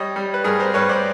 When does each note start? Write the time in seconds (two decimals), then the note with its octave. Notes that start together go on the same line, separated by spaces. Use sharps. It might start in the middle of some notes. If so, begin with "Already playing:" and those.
Already playing: G3 C#5 D#5
0.16 G3
0.34 B4
0.44 G2 G#4 A#4
0.60 A#4 C5
0.74 G2 B4 C#5
0.89 C5 D5